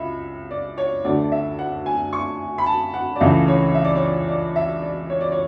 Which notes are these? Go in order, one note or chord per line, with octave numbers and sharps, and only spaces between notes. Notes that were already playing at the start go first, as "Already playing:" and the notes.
Already playing: C#2 E5 B5
D5
C#5
D2 D3 A3 D5
D5
E5
F#5
G#5
C#6
B5
A5
F#5
D5
C#2 C#3 E3 A3 E5
C#5
E5
D5
C#5
D5
D5
E5
D5
C#5
D5
C#5